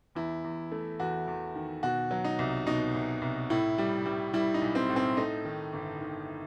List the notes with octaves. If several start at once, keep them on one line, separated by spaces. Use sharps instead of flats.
E2 E4
E2
A3
E2 F#4
E2
D#3
B2 F#4
F#3
D#4
C2
B2 D#4
C2
C2
A2 E4
G3
G3
G3 E4
D#4
B1
C4
A2
C4
A3 D#4
D#3
G1
D#3